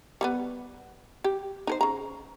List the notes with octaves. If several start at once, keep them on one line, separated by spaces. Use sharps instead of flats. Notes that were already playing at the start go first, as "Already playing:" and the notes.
G3 A#3 B3
G4
D#4 A#4 C5
C#3 A#5